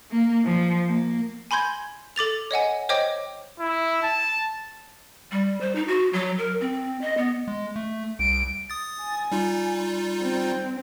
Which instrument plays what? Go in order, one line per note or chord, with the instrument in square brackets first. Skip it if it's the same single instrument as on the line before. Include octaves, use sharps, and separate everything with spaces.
[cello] A#3
F3
A#3
[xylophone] G#5 B5 C6 G6 G#6
A4 D6 A6 F7
C#5 D#5 F#5 G#5
C5 C#5 D#5 G5 D6
[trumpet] E4
A5
[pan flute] G3
C5
D#4
F#4
F#3
A#4
C4
D#5
B3
[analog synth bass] G#3
A3
[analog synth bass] C2 [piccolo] D7
[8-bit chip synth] D#6 A6
[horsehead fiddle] G#5
[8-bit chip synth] G3 D#4 F4
[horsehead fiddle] C4